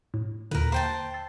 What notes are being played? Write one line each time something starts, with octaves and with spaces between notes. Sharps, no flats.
A2
D#2 A#2 D3 A#4 B4
A#3 C5 G5 A5
E6 A6 C7